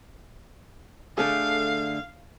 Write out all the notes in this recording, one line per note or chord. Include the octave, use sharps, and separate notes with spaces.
D3 A3 G#4 F5